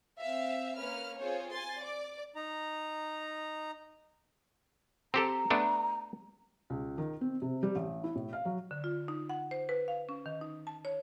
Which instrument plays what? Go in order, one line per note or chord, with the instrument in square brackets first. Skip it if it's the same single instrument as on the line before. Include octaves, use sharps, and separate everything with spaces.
[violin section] C4 E5 F5
A#3 C#4 B4 F6
C4 F4 G#4 C5 C#5
G#5 C6 A6
D5 D6
[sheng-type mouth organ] D#4 A#5
[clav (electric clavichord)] C4 G4 A4 [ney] A#5
[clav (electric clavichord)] A3 B3 D4
[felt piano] C#2
D#3
C4
C3
G3
A1
E4
A2
F5
F#3
[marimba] D3
F4
D#4
F#5
C5
B4
F5
C#4
D#3
D#4
A5
C#5